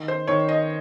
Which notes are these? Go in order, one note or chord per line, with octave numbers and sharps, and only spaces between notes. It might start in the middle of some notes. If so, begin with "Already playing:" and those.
Already playing: D#3
C5
D#3 C#5
D#5